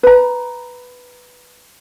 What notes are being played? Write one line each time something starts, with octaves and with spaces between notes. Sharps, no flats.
B4 A#5